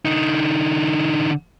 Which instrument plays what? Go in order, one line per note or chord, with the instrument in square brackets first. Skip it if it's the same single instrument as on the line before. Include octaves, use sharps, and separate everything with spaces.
[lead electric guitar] D3 D#4